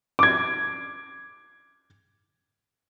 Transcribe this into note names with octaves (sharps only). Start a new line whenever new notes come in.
D6 G#6